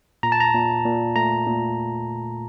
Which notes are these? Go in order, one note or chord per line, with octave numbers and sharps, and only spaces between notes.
A#2 A#5
A5
A#5
A#2
A#2
A3 A#5
A#2